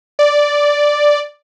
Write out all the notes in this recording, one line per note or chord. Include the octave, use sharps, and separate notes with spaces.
D5